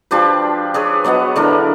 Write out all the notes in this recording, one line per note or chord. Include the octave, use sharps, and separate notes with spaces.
F3 D4 G4 B4
D4 G#4 B4 C#5
F#3 B3 D#5 F#5
D3 D4 E4 A#4